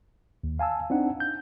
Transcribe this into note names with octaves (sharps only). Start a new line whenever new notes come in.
D#2
F5 G#5 A5 E6
C4 D4 D#4 F#5
G6